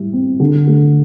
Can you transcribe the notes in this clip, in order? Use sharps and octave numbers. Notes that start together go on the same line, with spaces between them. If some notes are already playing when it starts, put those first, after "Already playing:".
Already playing: A2 G3 E4
C4
D3
A3